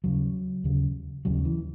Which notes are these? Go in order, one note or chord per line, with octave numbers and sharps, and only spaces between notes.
D#2 C#3 F#3
D#2 C#3
D#2 C#3 F#3
E3